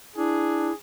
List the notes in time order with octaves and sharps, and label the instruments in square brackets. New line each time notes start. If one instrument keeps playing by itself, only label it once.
[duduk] D4 [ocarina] E4 [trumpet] G#4